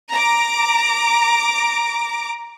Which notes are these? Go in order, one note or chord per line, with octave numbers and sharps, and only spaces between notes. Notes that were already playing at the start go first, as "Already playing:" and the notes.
A#5 D6